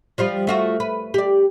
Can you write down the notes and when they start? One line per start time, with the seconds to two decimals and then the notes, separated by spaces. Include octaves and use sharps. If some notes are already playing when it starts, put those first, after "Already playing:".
0.18 F3 G3 F4
0.47 A3 F4 F#4
0.80 B4
1.14 G4 D5